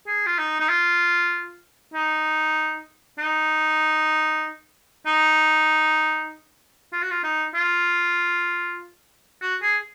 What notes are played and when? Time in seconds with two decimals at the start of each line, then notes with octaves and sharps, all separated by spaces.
0.07 G#4
0.26 F4
0.38 D#4
0.60 D#4
0.69 F4
1.94 D#4
3.18 D#4
5.06 D#4
6.92 F4
7.02 F#4
7.11 F4
7.24 D#4
7.55 F4
9.41 F#4
9.62 G#4